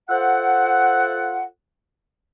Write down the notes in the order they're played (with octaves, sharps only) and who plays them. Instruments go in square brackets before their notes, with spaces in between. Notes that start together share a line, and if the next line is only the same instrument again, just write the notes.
[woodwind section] F4 A4 C5 E5 F#5